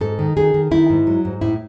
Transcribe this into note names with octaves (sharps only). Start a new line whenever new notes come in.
G#2 A4
D#3
D#3 G#4
D#3
D#3 E4
G#2
F#3
G#2
A2 E4